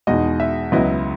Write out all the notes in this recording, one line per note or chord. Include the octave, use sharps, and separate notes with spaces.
E2 B2 G#3 D#4 D#5
E5
C#2 C#3 F#3 B3 E4 D#5